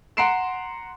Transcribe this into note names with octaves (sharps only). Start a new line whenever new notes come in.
F#5 A#5 C6 C7 D7 E7